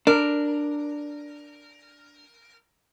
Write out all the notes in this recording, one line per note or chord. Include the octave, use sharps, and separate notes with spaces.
D4 A#4